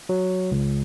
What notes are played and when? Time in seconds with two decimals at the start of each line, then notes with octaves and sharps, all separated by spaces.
0.09 F#3
0.51 C#2